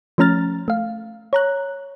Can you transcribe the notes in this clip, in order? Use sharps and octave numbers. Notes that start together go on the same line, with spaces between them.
F3 A3 C#4 A#5 F6 A6
A3 F5
C#5 A#5 F#6